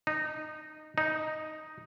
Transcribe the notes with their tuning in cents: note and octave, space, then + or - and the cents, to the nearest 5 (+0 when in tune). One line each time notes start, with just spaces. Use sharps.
D#4 -15
D#4 +0